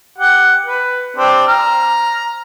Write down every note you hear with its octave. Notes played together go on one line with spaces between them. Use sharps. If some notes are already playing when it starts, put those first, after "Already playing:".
G4 F#5
B4
C4 D4 G4
A#5 F6